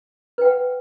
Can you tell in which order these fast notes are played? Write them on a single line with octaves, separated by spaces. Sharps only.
B4 G5 F#5